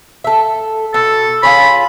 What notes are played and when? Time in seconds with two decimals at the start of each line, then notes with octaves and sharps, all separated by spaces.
0.24 A4 E5
0.94 B2 A4
1.43 F4 G#4 C#5 B5